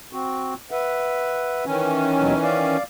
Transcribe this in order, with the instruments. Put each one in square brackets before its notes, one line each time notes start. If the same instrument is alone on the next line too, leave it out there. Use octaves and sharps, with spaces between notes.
[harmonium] C4 F#4
B4 E5 F#5
[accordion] D#3 E3 C#4
[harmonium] D#2 B2 F#3
D5 F5